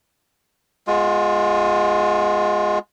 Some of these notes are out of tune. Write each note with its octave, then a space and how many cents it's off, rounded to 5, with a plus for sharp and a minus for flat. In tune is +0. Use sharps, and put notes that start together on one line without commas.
G#3 +0 B3 -5 F4 +35